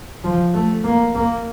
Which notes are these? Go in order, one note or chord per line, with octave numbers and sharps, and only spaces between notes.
F3
A3
A#3
A#3